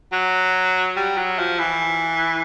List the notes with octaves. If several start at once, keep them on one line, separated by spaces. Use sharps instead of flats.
F#3
G3
F#3
F3
E3